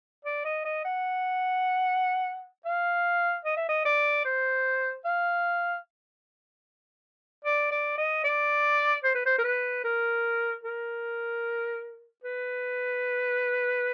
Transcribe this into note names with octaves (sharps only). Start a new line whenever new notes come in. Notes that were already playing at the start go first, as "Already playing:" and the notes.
D5
D#5
D#5
F#5
F5
D#5
E5
D#5
D5
C5
F5
D5
D5
D#5
D5
C5
B4
C5
A#4
B4
A#4
A#4
B4